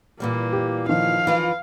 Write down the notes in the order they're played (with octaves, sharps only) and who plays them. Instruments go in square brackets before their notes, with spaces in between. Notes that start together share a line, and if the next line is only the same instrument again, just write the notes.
[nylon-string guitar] A#2 E3 G3 [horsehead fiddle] A#3
[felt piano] G4
[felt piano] D#3 F3 [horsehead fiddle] F5
[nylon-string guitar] E3 F4